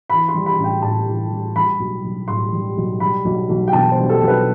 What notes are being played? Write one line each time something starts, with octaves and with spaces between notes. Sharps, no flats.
E3 B5
C6
G3
B5
A1
G5
A2 A5
E3
G3
G3 B5
B1
B1
A2 C6
G3
B1
G3 B5
B1
B1
G5
B2 A5
C5
G3
A4
B1
B4